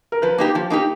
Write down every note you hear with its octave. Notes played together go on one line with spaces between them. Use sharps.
A#4
F3 B4
A#3 D#4 G4
F3
A#3 D#4 G4